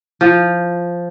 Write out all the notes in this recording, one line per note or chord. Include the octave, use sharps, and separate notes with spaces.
F3